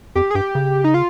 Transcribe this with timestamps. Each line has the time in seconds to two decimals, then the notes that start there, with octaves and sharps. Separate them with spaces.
0.15 F2 G4
0.31 G#4
0.35 G2 G4
0.55 C#3
0.84 D#4
0.94 F4